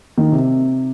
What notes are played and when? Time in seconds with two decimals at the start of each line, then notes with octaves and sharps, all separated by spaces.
0.18 D#3
0.32 C3